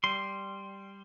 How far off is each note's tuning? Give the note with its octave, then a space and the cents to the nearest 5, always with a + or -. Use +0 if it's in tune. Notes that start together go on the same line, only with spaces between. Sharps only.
G3 +0 C6 +0